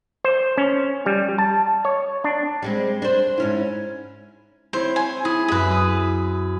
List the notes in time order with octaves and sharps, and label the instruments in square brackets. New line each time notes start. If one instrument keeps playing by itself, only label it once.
[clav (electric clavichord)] C5
C#4
G3
A5
C#5
D4
[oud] G3 G#3 C4
D4 C5
G#2 C#4 E4
[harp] C4 E4 C#5 [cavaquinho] C5
[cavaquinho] G#5
[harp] E4 [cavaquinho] G#4
[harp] F#2 E5 B6 [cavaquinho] G#4 B4
[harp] D#6